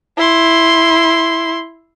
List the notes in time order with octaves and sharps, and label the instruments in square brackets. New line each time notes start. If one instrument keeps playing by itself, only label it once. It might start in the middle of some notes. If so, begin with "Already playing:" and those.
[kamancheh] E4 C6